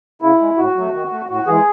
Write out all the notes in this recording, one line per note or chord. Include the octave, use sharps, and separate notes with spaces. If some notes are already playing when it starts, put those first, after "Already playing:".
C#3 E4
G#3
A2 F#4
F#3 A3
D#3
A3
A2 F#4
E3 G#3 G#4